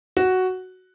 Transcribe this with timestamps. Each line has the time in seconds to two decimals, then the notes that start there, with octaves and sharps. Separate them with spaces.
0.17 F#4